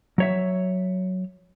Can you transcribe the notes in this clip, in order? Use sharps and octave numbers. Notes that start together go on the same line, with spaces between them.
F#3 C#5 E5